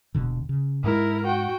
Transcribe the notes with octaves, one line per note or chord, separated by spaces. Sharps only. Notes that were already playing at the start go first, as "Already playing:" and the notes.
D#1 B2 D3
C#3
G#2 G#3 E4 A#4
F#4 G5